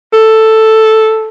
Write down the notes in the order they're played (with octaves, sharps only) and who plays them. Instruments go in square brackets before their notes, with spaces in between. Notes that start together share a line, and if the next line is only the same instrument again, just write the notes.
[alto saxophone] A4